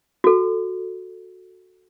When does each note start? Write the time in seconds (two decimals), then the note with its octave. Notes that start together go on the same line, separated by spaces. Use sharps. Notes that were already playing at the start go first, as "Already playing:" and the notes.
0.24 F#4 A4